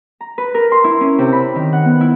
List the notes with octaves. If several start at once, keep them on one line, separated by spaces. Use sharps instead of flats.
A#5
B4
A#4
C6
E4
C#4
C3
B5
D#3
F#5
B3
E4